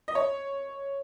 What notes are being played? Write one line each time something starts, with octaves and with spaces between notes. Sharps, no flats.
D#5
C#5